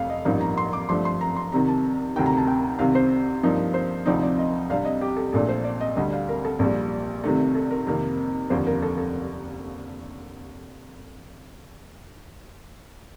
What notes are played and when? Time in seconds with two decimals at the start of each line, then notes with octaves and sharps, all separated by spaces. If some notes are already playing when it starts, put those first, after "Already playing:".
Already playing: F1 F2 A3 F5
0.10 D#5
0.25 A1 G2 F3 A#3 D#4 F5
0.41 A#5
0.57 C6
0.73 D6
0.89 G2 F3 A3 D4 C6
1.05 C6
1.21 A#5
1.36 C6
1.52 C2 C3 D#3 A#5
1.68 A5
2.16 D2 C3 D#3 G5
2.26 A#5
2.37 A5
2.47 G5
2.79 C2 C3 D#3 F5
2.95 C5
3.43 G2 F3 A#3 D#4
3.74 C5
4.06 D2 C3 F3 C4 D#4 D5
4.22 D5
4.38 D#5
4.69 C2 C3 G3 D4 F5
4.85 D#5
5.01 G4
5.17 A4
5.33 A#1 A#2 A3 D4 A4
5.49 C5
5.64 D5
5.81 D#5
5.96 D2 D3 G3 D#5
6.13 F5
6.29 A#4
6.45 A4
6.59 A#1 A#2 G3
7.24 C2 C3 D#3 A3 A4
7.55 A4
7.71 A#4
7.87 F2 C3 D#3 A#3
8.50 F1 D#2 D3 F3 C5
8.66 A#4
8.82 A4
8.98 A4